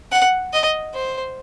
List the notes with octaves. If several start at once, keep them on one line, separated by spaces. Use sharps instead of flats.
F#5
D#5
C5